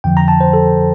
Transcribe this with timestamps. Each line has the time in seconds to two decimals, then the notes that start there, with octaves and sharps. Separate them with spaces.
0.04 F2 D3 F3 G5
0.17 A#5
0.28 A5
0.40 C5
0.53 A4